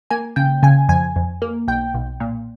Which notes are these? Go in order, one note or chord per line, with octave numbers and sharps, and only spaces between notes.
A#3 G#5
C#3 G5
C#3 G#5
F2 G#5
F2
A#3
B1 G5
B1
A#2